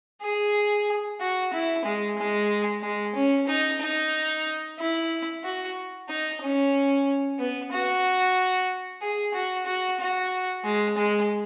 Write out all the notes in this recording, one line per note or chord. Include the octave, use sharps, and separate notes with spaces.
G#4
F#4
E4
G#3
G#3
G#3
C#4
D#4
D#4
E4
F#4
D#4
C#4
B3
F#4
G#4
F#4
F#4
F#4
G#3
G#3